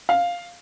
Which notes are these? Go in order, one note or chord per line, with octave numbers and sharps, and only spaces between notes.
F5